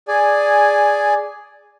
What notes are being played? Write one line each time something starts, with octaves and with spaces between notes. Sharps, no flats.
G#4 D5 G#5